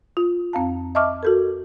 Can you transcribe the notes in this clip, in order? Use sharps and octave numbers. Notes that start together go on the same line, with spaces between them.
F4
F2 C4 F5 A5
D#5 E5 A5 C#6 D6 F6
F#4 A4 A#4